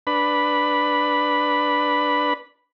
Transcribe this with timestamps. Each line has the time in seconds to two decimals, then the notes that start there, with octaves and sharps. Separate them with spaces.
0.07 D4 B4 B5